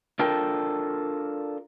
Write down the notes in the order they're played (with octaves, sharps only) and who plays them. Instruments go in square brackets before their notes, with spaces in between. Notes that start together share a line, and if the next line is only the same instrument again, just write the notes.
[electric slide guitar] D4 F4 A4 A#4 G5